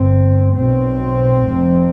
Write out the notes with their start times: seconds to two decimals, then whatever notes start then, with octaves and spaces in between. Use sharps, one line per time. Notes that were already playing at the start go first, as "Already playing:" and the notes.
Already playing: G1 G2 C4
0.56 B1 B2 C4
1.44 F1 F2 C3